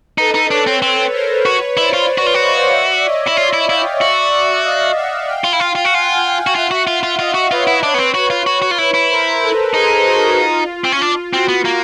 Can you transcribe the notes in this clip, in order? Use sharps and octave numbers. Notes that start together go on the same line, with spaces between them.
D#4 A4 B4
D#4
D4 B4 C#5
C4
C4 B4 C#5
A#4 C5
F#4 B4 C#5
E4 C5 D5
F4
F#4
F4
F#4
D#5 F5
D5 E5
C#5 D#5
E4
F4 D5 E5
E4
E4 F5 G5
F#4 D5 E5
D5 E5
D#5 F5
E5 F#5
F5 G5
F4
E4
F4
F4
F#4
F4 F#5 G#5
F5 G5
F#4
F4 E5 F#5
F#4
F4
F4
F4 D#5 F5
F#4
F4 B4 C#5
E4
D4
B3
C4
F#4
F4
F#4
F#4
F4
E4
E4
A#4 C5
A4 B4
D#4 G#4 A#4
F#4 G#4
F4
C4
C#4
D4 F4
C4 F#4
B3
A#3